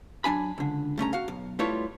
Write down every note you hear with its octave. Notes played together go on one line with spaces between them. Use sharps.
F#3 D4 G#5 B5
C#2 D3
G2 A3 C#4 A#5
F#4 F5
B1
G3 A3 E4 F4 B4 C#5